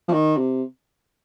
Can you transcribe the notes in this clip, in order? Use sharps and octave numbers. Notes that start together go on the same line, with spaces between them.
F3
D#3
C3